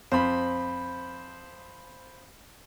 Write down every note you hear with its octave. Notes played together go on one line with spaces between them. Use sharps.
F2 C5 B5